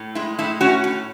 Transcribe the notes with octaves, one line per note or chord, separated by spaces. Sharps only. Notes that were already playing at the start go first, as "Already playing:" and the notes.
Already playing: A2
G#3 E4
A2 E4
C#4 F#4
A2